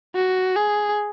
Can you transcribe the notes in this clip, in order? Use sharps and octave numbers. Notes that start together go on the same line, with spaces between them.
F#4
G#4